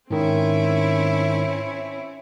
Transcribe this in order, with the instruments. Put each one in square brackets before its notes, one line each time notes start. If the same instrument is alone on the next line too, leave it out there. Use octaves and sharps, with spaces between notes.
[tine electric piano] G#2 D#3 [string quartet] C4 C#4 E4